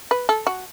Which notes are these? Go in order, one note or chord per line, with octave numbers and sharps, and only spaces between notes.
B4
A4
F#4